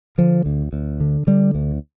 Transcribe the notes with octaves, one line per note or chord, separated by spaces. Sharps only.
D3 F3
D2
D2
D3
D3 G3
D2